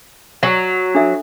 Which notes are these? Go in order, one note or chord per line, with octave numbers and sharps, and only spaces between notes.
F#3 F#5
D4 A4 E5